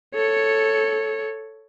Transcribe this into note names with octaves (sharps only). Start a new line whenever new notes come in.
A4 C#5